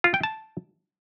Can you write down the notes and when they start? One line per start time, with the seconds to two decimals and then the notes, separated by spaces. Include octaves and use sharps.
0.04 F4
0.14 G5
0.23 A5